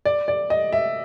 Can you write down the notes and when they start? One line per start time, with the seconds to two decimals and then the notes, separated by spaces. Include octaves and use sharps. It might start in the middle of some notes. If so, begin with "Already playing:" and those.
0.05 D5
0.28 D5
0.50 D#5
0.73 E5